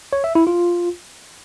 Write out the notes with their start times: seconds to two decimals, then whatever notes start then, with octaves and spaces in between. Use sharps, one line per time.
0.13 C#5
0.24 E5
0.35 E4
0.47 F4